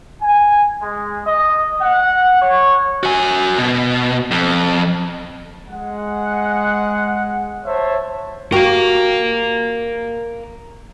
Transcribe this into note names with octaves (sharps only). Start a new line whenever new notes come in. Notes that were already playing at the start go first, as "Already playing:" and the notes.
G#5
G#3
D#5
F#5
C#5
F#4 G#5
B2
F2
G#3 F#5
C5 C#5 E5 A5
F#4 G4 A#4 F5